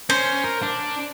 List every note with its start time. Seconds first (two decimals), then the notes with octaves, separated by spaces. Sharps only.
0.10 C#4 C5
0.44 A#4
0.63 D4